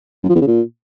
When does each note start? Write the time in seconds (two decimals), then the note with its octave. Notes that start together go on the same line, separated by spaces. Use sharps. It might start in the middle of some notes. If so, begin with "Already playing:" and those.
0.23 F#2
0.29 F3
0.35 E2
0.41 C#3
0.47 A#2